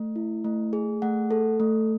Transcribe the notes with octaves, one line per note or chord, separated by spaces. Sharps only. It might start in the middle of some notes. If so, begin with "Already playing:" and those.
Already playing: A3
E4
A3
G#4
A3 F#5
A4
A3